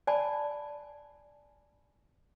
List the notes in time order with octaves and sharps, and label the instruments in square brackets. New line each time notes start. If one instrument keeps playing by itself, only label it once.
[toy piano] D5 G#5 A5 B5